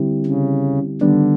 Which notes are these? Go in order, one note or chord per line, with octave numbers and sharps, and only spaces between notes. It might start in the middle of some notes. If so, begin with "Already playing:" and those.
Already playing: D3 G3 C4 E4 G4
C#3
D3 D#3 G3 B3 D4